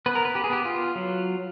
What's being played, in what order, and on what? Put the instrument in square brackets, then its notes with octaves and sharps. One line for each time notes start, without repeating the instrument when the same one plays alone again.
[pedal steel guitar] B3 B4
A#4
B4
G4
G#4
B3 G4
F4
F#3